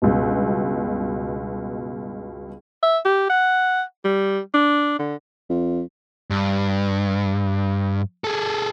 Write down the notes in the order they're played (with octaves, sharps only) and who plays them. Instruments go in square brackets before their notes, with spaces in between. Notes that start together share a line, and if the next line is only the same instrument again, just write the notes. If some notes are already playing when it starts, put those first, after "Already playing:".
[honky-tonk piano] C#2 G2 B2
[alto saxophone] E5
G4
F#5
G3
D4
D3
[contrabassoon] F2
[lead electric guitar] G2
G#4 A4